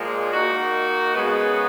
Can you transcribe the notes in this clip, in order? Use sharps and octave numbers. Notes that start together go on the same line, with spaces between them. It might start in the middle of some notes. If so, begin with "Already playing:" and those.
Already playing: A#2 F3 G#3
D#3 A#3 D#4 F#4
C#3 G#3 B3